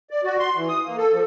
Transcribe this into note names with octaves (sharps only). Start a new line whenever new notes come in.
D5
F#4
C6
E3
D#6
A#3
A4
F3